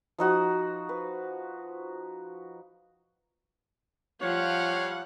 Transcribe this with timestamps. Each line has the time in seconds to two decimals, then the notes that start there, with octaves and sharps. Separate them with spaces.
0.18 F3 D#4 F#4 D#6
0.89 B4
4.22 F3 G3 C#5 F5 F#5